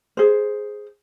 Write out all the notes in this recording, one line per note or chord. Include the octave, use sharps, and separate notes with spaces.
G#4 C5